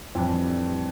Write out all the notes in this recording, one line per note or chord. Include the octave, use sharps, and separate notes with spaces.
F2 A2 E3 G3 D4